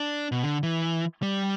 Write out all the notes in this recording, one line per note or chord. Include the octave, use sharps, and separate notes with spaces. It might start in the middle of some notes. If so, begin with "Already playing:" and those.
Already playing: D4
B2
D3
E3
G3